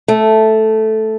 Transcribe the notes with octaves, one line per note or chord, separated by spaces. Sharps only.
A3